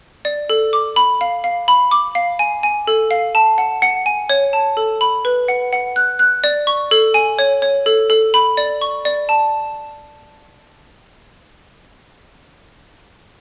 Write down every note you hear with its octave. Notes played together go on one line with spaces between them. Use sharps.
D5
A4
D6
B5
F5
F5
B5
D6
F5
G#5
G#5
A4
F5
A5
F#5
F#5
G#5
C#5
A5
A4
B5
B4
F#5
F#5
F#6
F#6
D5
C#6
A4
G#5
C#5
C#5
A4
A4
B5
D5
C#6
D5
A5